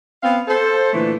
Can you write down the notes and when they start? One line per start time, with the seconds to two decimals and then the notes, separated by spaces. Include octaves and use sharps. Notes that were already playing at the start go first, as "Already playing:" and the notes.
0.22 B3 C4 F5
0.48 A4 C5
0.92 A#2 D3 E3 A3